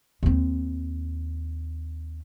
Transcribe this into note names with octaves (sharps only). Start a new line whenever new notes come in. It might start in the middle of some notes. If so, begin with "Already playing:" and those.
D#2 C4